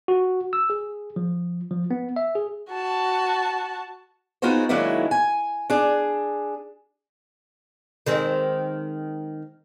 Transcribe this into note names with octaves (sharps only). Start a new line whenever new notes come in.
F#4
E6
G#4
F3
F3
B3
E5
G#4
F#4 A5
B3 D#4 F4 F#4 G#4 C5
D#3 F#3 G#3 A#3 D4 E4
G#5
D4 G#4
D#3 G#3 C4